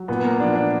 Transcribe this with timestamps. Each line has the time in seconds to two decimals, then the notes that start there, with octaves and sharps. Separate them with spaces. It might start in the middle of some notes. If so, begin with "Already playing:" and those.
Already playing: F#3
0.08 A#2 B3
0.24 A#3
0.40 F3 D4
0.55 D4